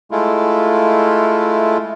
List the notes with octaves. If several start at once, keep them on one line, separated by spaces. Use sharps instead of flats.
G#3 A3 E4 F4